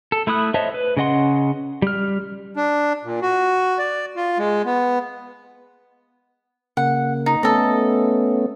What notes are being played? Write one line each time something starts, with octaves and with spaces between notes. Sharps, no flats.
A4
A3 E4 B5 D#6 F#6
C5 C#5 D#5 E5 A5
B4
C#3 C#4 D#5 F#5 C6
G3 F6
D4
A#2
F#4
D5
F4
G#3
B3
C#3 A#3 F#5
D#4
A3 B3 C#4 A4 D#5